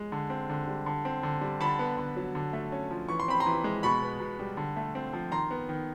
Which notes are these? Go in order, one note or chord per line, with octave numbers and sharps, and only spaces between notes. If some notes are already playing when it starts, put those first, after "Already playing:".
Already playing: G#3
D3
C4
D3
G3
D3
C4
D3
G3
D3 A5 B5
B3
D3
F#3
D3
A3
C#4
F3
E3 C#6
C6
C4 B5
A#5 C6
E3
G#3
B2 B5 C#6
B3
B2
G3
D3
A3
C4
F3
D#3 A#5 C6
B3
D#3